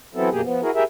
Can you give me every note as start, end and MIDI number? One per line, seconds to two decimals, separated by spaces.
0.15 0.29 52
0.15 0.29 54
0.15 0.29 59
0.15 0.29 60
0.15 0.29 64
0.15 0.29 69
0.31 0.41 42
0.31 0.41 47
0.31 0.41 58
0.31 0.41 67
0.31 0.41 68
0.43 0.61 53
0.43 0.61 59
0.62 0.71 64
0.62 0.71 66
0.62 0.71 68
0.62 0.71 70
0.75 0.84 64
0.75 0.84 67
0.75 0.84 68
0.75 0.84 70
0.75 0.84 76